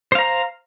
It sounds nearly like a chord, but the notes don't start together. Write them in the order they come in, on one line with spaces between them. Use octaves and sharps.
C5 F5 A#5